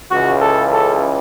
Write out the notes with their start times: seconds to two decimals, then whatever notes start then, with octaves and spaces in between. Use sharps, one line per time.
0.12 C#2 C#3 E3 F#4
0.42 A4
0.73 A4